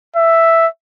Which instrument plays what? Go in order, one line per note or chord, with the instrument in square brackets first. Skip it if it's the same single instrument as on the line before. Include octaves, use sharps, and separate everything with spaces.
[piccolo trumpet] E5